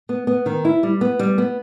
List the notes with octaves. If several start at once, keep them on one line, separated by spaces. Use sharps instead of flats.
B3
B3
D#3
E4
G3
B3
G3
B3